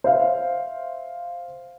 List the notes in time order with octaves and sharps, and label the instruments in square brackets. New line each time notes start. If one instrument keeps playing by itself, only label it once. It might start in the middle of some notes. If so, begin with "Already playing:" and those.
[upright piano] C5 E5 F5